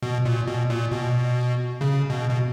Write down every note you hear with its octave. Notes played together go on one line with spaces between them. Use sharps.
B2
A#2
B2
A#2
B2
C#3
B2
B2